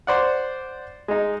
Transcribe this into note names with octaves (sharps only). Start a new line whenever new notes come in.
C5 D5 F#5
G#3 D#4